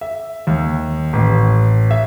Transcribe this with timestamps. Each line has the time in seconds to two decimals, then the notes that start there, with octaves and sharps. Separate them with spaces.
0.01 E5
0.47 D#2
1.13 A1
1.91 E5